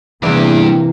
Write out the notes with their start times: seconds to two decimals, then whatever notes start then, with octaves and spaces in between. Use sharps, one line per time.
0.23 E2 G2 C3 E3 A#3 G4